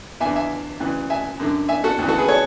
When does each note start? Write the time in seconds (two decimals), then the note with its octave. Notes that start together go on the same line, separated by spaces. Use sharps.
0.20 E2 E5 G#5
0.25 D3
0.36 E5 G#5
0.80 D2 C#3 E3
1.10 E5 G#5
1.40 F#2 D3
1.68 E5 G#5
1.84 F#4 A4
1.99 D2 C#3 E3
2.08 F#4 A4
2.18 G#4 B4
2.28 A4 C#5